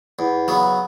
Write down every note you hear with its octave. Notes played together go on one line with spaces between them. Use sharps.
E2
C#3 F#3 B3